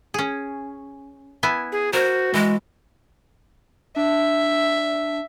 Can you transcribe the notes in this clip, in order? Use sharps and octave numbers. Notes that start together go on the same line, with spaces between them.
C#4 G#4
B3 E4 G#5
G#4
F#4 A#4 C5
E3 G#3
D4 E5